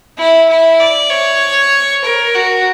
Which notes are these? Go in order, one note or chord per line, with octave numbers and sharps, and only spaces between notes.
E4
E4
D5
C#5
A#4
F#4